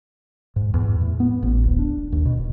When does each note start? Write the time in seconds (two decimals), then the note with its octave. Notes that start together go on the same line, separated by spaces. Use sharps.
0.56 G#2
0.74 E2
1.01 A2
1.20 B3
1.43 A1
1.64 D1
1.79 D4
2.12 D#2
2.25 B2
2.37 D#1